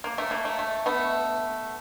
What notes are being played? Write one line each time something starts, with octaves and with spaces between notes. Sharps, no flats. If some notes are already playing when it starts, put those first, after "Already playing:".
A#3
A3
A#3
A3
A3
A3 B3